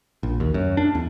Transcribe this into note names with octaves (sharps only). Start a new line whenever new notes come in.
A#1
D#2
F#2
D4
E2